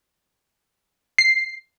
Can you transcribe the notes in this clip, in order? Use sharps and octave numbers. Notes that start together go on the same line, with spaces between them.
C7